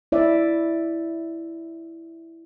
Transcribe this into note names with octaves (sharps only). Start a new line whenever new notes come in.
E4 D5 E5